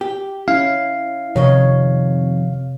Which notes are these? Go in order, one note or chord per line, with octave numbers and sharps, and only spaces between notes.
G4
C#4 E4 F5
F2 C3 D#3 C#5 D#5